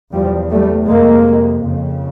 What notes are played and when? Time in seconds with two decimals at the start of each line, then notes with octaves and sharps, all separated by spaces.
0.13 E2 B2 F3 G3
0.51 G3 A3
0.88 F2 C3 G#3 A#3
1.64 F2 C#3